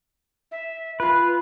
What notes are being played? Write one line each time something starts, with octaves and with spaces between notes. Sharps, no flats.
E5
F4 B4